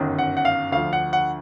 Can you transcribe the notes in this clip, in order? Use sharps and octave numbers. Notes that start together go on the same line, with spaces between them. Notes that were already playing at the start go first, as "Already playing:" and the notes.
Already playing: G1 F#2 D#3
F#5
F#5
F5
D2 D3 F3 F5
F#5
F#5